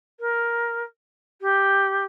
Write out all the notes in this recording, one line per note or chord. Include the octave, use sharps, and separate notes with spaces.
A#4
G4